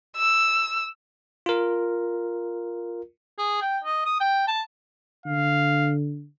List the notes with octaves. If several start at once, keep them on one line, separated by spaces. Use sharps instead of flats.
E6
F4 A#4
G#4
G5
D#5
D#6
G5
A5
D3 F5